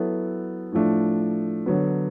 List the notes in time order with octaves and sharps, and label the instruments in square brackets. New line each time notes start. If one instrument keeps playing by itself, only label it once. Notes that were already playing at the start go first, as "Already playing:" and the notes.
Already playing: [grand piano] F#3 B3 E4 A4
A2 F3 A3 D4
D3 F#3 B3